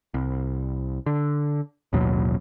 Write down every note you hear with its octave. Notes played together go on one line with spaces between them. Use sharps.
C2
D3
A1 D#2 B2 F#3